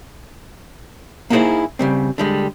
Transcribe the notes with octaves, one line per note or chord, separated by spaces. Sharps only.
A#3 B3 D#4 E4 G#4 C5
C#3 G3 C4
D3 G3 G#3